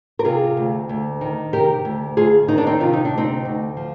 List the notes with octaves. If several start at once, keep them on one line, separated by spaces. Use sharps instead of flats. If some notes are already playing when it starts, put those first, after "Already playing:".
A#4
C3 F4 G#4
D2
D2
D#3
C3 G4 A#4
D2
D2 F4 G#4
D#3 D#4
D4
C4 D#4
C3 F4
D#4
D4
D2
C4 D#4
D2
F3